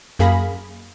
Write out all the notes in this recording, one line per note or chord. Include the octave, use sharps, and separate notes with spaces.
F#2 A#3 G#4 F5 B5 A#6